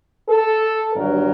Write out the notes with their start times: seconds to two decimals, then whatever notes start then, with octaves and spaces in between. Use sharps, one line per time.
0.29 A4
0.94 G1 G2 D#3 F#3 A#4